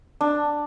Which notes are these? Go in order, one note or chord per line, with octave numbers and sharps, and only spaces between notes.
D4